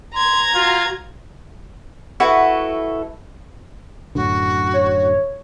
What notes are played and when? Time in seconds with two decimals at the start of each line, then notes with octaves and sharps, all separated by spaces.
0.14 A#5 C6 G#6
0.55 F4 F#4
2.20 E4 F#4 A4 B4
4.15 F#2 A2 D3 F#4
4.73 C#5